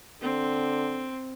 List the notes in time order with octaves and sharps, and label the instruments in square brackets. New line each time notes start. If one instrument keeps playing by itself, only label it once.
[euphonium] D3 [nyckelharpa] C4